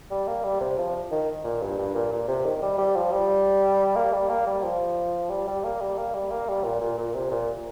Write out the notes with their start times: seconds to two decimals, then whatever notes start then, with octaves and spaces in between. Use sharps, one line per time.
0.11 G3
0.27 A#3
0.44 G3
0.61 C3
0.78 F3
1.11 D#3
1.44 A#2
1.62 G2
1.78 G2
1.94 A#2
2.12 A#2
2.28 C3
2.46 D#3
2.62 G3
2.78 G3
2.96 F3
3.12 G3
3.96 A#3
4.13 G3
4.29 A#3
4.46 G3
4.63 F3
5.30 G3
5.47 G3
5.64 A#3
5.80 G3
5.98 A#3
6.14 G3
6.31 A#3
6.48 G3
6.64 A#2
6.81 A#2
6.98 A#2
7.14 C3
7.31 A#2